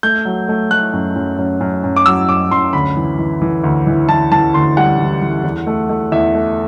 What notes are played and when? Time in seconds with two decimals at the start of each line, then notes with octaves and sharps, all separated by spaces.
0.03 A3 G6
0.25 F#3
0.48 A3
0.71 A3 F#6
0.93 F#2
1.16 F#2
1.38 F#2
1.60 F#2
1.84 F#2
1.96 D6
2.06 F#3 E6
2.28 F#2 D6
2.51 F#2 C6
2.73 D2 B5
2.97 E3
3.19 E3
3.42 E3
3.64 D2
3.87 E3
4.08 E3 A5
4.32 E3 A5
4.54 D2 C6
4.77 G3 F#5
4.98 E3
5.22 E3
5.44 E2
5.67 A3
5.89 A3
6.12 E2 E5
6.34 A3